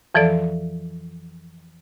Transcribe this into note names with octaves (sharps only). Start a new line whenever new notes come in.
F2 E3 F3 A4 D5